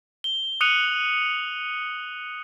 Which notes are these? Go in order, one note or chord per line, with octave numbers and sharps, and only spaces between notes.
G7
D#6 F#6 C#7 D#7 F7 F#7